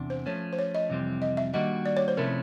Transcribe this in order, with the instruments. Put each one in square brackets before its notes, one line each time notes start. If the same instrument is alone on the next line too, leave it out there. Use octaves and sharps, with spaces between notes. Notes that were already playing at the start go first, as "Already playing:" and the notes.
Already playing: [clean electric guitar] E2 C3 D4
[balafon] C5
[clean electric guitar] F3 A3 C#4 [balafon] C#5
[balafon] C5
C#5
D#5
[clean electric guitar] F2 C3 E3 G3 C4
[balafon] D#5
E5
[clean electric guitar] D#3 G3 A#3 D4 F#4 [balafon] D#5
[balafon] D5
C#5
C5
[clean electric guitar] C3 F3 A3 C#4 E4 [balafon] A#4